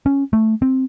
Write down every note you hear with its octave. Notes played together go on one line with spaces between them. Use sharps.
C#4
A3
C4